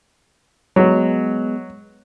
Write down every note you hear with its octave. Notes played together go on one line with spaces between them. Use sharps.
F#3 G#3 B3